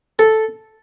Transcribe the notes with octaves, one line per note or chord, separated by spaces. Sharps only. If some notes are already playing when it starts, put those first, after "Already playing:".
A4